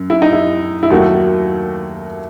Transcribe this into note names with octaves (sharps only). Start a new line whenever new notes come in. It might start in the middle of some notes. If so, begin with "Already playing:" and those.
Already playing: F#2
E4
D#4
E4
E4
D#2 D#3 F#3 A3 F#4